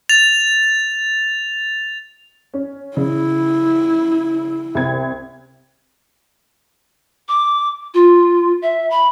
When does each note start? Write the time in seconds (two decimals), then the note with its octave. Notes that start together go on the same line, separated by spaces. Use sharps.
0.09 A6 F7
2.54 C#4
2.97 C#3 E4
4.75 C2 G#6
7.28 D6
7.94 F4
8.62 E5
8.90 B5